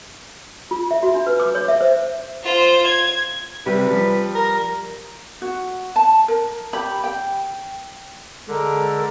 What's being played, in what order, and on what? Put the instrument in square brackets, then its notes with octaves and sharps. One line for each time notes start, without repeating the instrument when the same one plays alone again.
[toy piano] F4
E5
F#4
D4
B4
D6
C#5
E5
C5
[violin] F4 C5
G#6
[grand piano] C3 G3 [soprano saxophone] B4
[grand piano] F3 G3
[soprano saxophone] A#4
[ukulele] F#4
A5
A#4
G4 B5
G5
[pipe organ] D3 [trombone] G#3 [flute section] A4 A#4